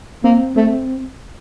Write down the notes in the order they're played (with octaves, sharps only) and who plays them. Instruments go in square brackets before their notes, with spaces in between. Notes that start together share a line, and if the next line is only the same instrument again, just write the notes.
[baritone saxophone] A#3 [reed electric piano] C4
[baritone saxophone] A3 [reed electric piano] C4